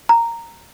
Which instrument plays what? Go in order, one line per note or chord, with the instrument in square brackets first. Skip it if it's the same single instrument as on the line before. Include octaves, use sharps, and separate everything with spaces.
[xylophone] A#5